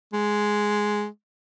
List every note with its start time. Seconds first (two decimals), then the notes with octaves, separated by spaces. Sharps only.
0.13 G#3